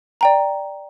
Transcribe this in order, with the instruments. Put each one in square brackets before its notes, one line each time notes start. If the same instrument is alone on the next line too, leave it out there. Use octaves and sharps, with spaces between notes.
[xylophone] D5 G5 A#5